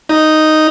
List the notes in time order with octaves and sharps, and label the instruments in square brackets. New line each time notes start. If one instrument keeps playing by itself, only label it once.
[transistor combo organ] D#4